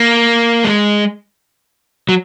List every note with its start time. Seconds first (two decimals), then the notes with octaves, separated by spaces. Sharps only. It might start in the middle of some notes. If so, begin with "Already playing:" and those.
Already playing: A#3
0.64 G#3
2.09 F#3